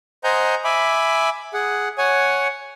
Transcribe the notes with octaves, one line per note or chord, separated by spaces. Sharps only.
C5 D#5 F#5 G#5 A#5 G6
E5 G#5 B5 D6
G#4 F#5
C#5 F#5 G#5